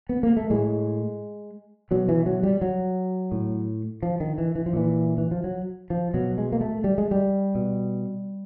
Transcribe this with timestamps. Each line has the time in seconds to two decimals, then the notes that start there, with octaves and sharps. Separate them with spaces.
0.09 B3
0.23 A#3
0.37 A3
0.50 A2 G#3
1.91 B2 F#3
2.09 E3
2.26 F#3
2.43 G3
2.61 F#3
3.32 A2
4.03 F3
4.20 D#3
4.38 E3
4.55 E3
4.66 F3
4.73 A#2 E3
5.18 E3
5.31 F3
5.44 F#3
5.90 F3
6.14 B2 F#3
6.38 G#3
6.52 A#3
6.61 A3
6.84 G3
6.98 G#3
7.11 G3
7.55 B2